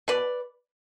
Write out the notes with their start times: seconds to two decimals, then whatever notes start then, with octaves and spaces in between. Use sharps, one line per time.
0.08 B2 B4 D5